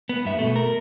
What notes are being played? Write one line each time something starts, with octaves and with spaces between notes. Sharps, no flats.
B3
G2 E5
B2 A3
A#4